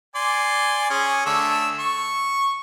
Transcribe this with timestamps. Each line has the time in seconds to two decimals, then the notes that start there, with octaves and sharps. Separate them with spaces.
0.15 D5 G#5 C6
0.90 C#4 G#4
1.26 D3 A3 E6
1.79 C#6